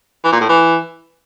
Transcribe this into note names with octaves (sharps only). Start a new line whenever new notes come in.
E3
A#2
A2
E3